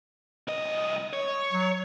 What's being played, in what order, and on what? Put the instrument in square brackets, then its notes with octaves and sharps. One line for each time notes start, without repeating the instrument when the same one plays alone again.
[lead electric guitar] C2 D#5
C#5
[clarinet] F#3